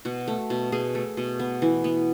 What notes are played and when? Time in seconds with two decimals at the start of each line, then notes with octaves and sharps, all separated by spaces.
0.05 B2 F#4
0.28 A3
0.50 B2
0.72 B2 G#4
0.95 A3
1.17 B2
1.39 B3
1.62 E3
1.84 B3